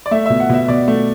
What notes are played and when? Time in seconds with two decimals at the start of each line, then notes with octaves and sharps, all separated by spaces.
0.06 D5
0.11 A3 E5
0.26 B2 E5
0.40 F#5
0.49 B2 E5
0.68 B2 D5
0.88 A3